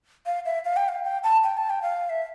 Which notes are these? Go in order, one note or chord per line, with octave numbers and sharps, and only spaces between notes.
F5
E5
F5
G5
F5
G5
A5
G5
A5
G5
F5
E5